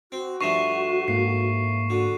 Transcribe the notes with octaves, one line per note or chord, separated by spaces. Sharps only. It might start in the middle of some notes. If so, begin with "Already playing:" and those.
C4 F#4
G2 F3 A3 C#6 C7 E7
G#2 A#3 C7
D3 F#4